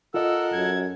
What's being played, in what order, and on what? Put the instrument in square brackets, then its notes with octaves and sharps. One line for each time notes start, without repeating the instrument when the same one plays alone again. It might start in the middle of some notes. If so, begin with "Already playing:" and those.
[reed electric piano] F4 D#5 [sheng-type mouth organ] A4 A#4 F#5 [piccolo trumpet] E6
[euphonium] F#2 [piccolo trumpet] G#6